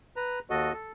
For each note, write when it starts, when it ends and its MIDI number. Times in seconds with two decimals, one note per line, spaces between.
0.16 0.39 71
0.16 0.39 82
0.50 0.73 39
0.50 0.73 66
0.50 0.73 69
0.50 0.73 75
0.73 0.92 69